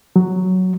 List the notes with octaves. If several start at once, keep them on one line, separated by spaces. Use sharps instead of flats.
F#3